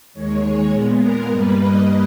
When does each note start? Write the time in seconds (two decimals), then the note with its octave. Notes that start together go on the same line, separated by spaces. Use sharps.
0.14 D#2 D#3 G#3 C#5
0.43 G#4
0.71 A#2 G#3 B3
1.00 A#4
1.28 G2 G3 A#3 B4
1.57 D#5